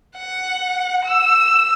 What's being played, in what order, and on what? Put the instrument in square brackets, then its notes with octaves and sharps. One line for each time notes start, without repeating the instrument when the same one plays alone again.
[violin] F#5
E6